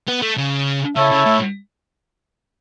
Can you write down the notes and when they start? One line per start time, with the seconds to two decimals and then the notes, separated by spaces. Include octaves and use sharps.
0.08 B3
0.22 A3
0.37 C#3
0.96 C#3 E4 A4 C#5 E5
1.11 C#3
1.25 A2